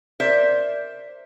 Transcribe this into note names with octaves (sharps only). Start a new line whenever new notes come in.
A#4 C5 D5 E5